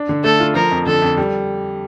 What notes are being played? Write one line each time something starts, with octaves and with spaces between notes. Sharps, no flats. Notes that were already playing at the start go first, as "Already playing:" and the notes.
Already playing: D4
D3
A3 A4
F4
F3 A#4
F2
D3 A4
F2
G3